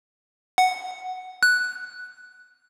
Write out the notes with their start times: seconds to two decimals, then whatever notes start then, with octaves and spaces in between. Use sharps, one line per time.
0.58 F#5
1.43 F#6